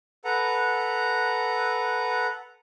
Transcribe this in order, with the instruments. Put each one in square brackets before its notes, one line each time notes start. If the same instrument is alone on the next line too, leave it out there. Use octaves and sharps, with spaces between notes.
[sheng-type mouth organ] A4 B4 F#5 A#5